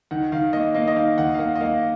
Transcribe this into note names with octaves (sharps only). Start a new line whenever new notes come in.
D#3 F#5
D#3 F5
A#3 D#5
A#3 D#5
D#5
D#3 F5
D#3 F#5
F5
A#3 F#5
D#5
A#3 F5